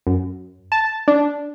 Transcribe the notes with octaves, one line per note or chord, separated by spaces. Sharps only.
F#2
A5
D4